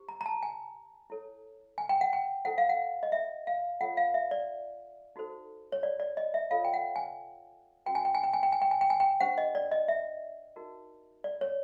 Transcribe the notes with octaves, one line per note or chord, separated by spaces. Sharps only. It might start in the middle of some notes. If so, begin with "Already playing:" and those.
Already playing: E4 G4 C5
A#5
A#5
A5
G#5
E4 A4 C#5
G#5
G5
F#5
G5
E4 A4 C5 F#5
F5
F#5
D#5
E5
F5
F4 A4 C#5 F#5
F5
E5
D5
D#4 F#4 A4 C5
C#5
D5
D5
D#5
E5
F4 A4 C#5 F5
G5
F#5
G#5
C#4 F#4 B4 G5
G#5
G5
G#5
G5
G#5
G5
G#5
G5
G#5
G5
G#5
G5
D4 G4 C5 F#5
D#5
D5
D#5
E5
D#4 F#4 A#4
D5
C#5